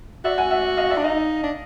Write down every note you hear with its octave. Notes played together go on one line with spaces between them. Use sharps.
F#4 D5 E5
F#5 G#5
E5 F#5
D#5 F5
D5 E5
D4
D#4 D#5 F5
D4